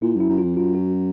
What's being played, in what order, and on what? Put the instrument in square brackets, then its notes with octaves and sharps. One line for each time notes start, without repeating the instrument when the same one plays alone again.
[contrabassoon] A#2 [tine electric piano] E4
[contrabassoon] F#2
[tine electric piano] E4
[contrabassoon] F#2
[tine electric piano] F4
[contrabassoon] F2
[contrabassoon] F#2 [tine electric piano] F4
[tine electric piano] F#4